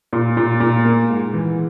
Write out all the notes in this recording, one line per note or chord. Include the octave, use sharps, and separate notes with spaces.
A#2
A#2
A#2
A#3
G#2
E3